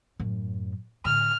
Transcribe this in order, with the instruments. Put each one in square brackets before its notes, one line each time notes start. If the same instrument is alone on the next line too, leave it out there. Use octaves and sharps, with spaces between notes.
[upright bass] F#2 A2
[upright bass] A2 D3 [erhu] F6